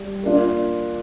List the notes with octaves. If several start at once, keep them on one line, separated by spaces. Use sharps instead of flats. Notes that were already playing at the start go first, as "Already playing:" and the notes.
Already playing: G3
A#3 D4 F4